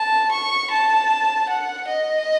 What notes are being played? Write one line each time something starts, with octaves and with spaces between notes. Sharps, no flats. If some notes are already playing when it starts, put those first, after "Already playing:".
Already playing: A5
C#6
A5
F#5
D#5